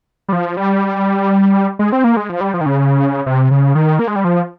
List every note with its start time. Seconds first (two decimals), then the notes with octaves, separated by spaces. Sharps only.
0.28 G3
0.33 F3
0.57 G3
1.79 G#3
1.92 C4
2.04 A#3
2.17 G#3
2.29 F3
2.41 G3
2.54 F3
2.61 D#3
2.66 C#3
3.26 C3
3.51 C#3
3.75 D#3
3.99 A#3
4.08 G#3
4.16 G3
4.24 F3